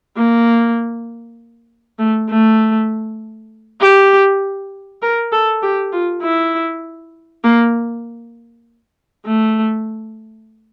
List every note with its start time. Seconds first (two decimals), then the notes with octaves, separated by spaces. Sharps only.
0.17 A#3
1.99 A3
2.29 A3
3.81 G4
5.02 A#4
5.32 A4
5.62 G4
5.92 F4
6.23 E4
7.44 A#3
9.26 A3